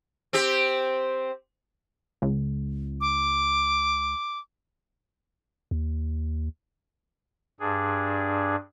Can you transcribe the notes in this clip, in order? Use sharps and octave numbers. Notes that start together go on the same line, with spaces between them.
C4 G4
C#2
D6
D#2
G2 D4 G#4